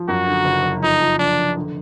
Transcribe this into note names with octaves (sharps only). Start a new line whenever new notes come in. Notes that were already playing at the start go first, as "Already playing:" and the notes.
Already playing: F3
F#2 F#4
D3
F#1
F#1
F2 D#4
F3
F1 D4
F1
D3